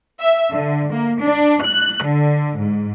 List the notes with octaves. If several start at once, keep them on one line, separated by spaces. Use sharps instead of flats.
E5
D3
A#3
D4
F#6
D3
G#2